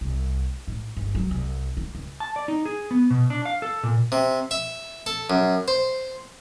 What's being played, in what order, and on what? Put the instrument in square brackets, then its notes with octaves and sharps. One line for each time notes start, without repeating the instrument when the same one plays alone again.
[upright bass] C2
A2
G1
F#3
C2
D3
C#2
[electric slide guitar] A5
D5
D#4
G#4
B3
B2
D4
F5
A4
A#2
[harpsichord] C3
E5
A4
F#2
C5